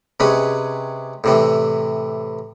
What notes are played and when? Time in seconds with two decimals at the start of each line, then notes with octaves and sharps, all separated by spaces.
0.20 C3 G#3 C#4 B4
1.24 A2 C3 E3